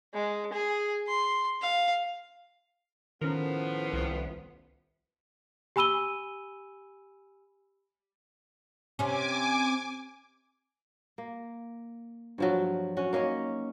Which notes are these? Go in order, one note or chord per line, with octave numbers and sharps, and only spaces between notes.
G#3
G#4
C6
F5
A2 D#3 F3 B3 C#4 A#4
C2
G4 G#5 B5 E6 D#7 G7
C3 C#4 G#5 D6
A#3
G2 F3 F#3
C#4 F#4
A#3 C#4 D#4 C#5